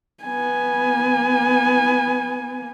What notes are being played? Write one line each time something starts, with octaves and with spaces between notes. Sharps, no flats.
B3 G#5